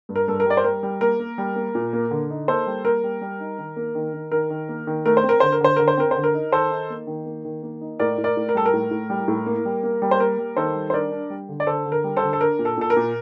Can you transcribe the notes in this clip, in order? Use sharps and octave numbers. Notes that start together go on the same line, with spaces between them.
G2
A#4
G2 A4
A#4
G3 D5
C5
G3 A#4
G3
A#3 A#4
A#3
G3
A#3
A#2
A#3
D3
D#4
A#3 A4 C5
G3
A#3 A#4
G3
G3
D#4
D#3
A#3
D#3
D#3
D#3 A#4
D#3
A#3
D#3
A3 A#4
C5
C4
A#4
D3 C5
A#4
D3 C5
D3 A#4
C5
C4 A#4
D3 C5
A#4
D#4
D#3 A4 C5
D#4
A#3
D#3
A#3
D#3
A#3
D#4
A2 A#4 D5
A2
A#4 D5
A2
A#4
G3 A4
A#4
A2
A2
G3
A2
A#3
G3
A#3
G3
C5
A#3 A#4
G3
D#3 A4 C5
G3
C5
D4 A#4 D5
D4
G3
D3
D5
D3 A4 C5
D3
A#4
G3
A4 C5
D3
A4
D4 A#4
A#2
A4
A#2 A4
A#4
A#2